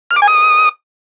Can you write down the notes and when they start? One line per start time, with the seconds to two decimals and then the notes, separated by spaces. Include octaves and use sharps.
0.11 F6
0.16 D6
0.22 G#5
0.28 D#6